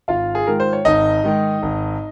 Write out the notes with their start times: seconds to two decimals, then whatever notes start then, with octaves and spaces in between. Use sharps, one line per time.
0.08 G#1 F4 F5
0.35 G#4
0.47 G#2 D#3 A#4
0.60 C5
0.73 C#5
0.85 G#1 D#4 D#5
1.24 G#2 D#3
1.63 G#1